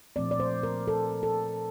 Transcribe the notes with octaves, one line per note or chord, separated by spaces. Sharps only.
A#2 F3 A3 C4 D5
D5
C5
A#4
A4
A4